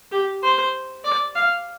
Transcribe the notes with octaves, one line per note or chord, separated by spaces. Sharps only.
G4
C5
D5
F5